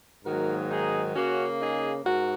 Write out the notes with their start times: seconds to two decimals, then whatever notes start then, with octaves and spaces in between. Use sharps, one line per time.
0.25 G#2 D#3 F#3 A#3 F#4 A#4
0.70 D#4 G#4
1.15 C#3 A#3 C#4 F#4
1.60 D#4 G#4
2.05 G#2 F#4 A#4